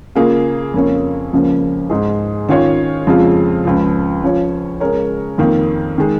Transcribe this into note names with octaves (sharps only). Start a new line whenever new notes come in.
C#3 A#3 F4 G#4
F2 C#3 A#3 C#4
C#2 C#3 F3 A#3 C#4
G#2 G#3 D#4 G#4
D#3 C#4 F4 C#5
F2 C#3 F3 G#3 F4
C#2 C#3 F3
F3 C#4 F4 C#5
C#3 G#3 C#4 A#4 C#5
F2 D#3 A#3
D#3 G#3